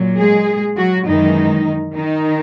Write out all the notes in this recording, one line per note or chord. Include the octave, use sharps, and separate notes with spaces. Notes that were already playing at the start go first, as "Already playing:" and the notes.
Already playing: A#2 F#3
G#3 G#4
F#3 F#4
F#2 D#3 E3 G#3 D#4
D#3 D#4